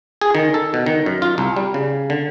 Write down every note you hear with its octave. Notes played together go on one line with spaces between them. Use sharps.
G#4
D#3
A4
B2
D#3
F#2
F4
C2
G3
C#3
D3